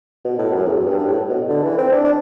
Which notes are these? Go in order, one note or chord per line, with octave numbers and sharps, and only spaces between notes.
B2
A2
F#2
E2
F#2
G2
G2
A2
B2
D3
E3
C4
D4
D4